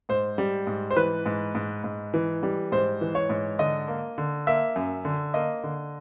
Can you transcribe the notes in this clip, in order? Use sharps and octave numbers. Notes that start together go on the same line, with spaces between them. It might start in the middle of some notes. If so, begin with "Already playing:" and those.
G#2 C5
G3
G#2
C5
E3 B4
G#2
G#2
G#2
E3
G3
G#2 C5
E3
C#5
G#2
D3 D#5
A#3
D3
A#3 E5
F#2
D3
A#3 D#5
D3